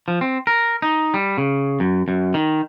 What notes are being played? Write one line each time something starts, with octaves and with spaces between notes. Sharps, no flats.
F3
C4
A#4
D#4
G3
C#3
F#2
F#2
D#3